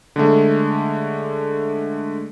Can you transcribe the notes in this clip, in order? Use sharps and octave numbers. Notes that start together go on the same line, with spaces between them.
D3 G#3 A3